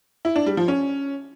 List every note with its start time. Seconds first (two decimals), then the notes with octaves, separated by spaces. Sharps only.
0.25 E4
0.36 D4
0.46 G3
0.57 F3
0.68 C#4